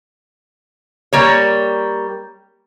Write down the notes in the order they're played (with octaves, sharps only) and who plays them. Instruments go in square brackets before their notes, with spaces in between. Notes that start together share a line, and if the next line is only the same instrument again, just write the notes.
[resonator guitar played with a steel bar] G3 A#3 C#5